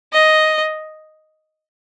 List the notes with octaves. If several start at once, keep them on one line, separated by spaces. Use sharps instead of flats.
D#5